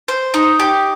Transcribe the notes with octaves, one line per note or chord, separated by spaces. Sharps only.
C5
D#4
G4